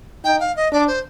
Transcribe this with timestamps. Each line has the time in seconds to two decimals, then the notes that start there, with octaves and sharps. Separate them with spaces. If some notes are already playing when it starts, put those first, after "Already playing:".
0.24 D#4 G5
0.40 F5
0.56 D#5
0.72 D4 D5
0.87 C5